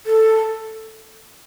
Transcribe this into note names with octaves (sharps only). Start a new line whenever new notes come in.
A4